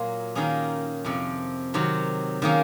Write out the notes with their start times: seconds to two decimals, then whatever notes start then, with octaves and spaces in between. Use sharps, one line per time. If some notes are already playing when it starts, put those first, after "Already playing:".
Already playing: A#2 F#3 A#3 F4 G#4
0.35 D#3 A#3 C#4 G#4
1.05 F2 C3 F3
1.74 C3 D#3 F#3
2.42 D#3 A#3 C#4 G#4